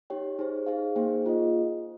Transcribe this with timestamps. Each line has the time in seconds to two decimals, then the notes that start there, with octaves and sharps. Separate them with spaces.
0.10 D#4 G4 C#5 G5
0.39 D#4 G#4 C5
0.66 D#4 G#4 C5 F5
0.96 A#3 D#4 G#4 C5 G5
1.25 A#3 F4 G#4 D#5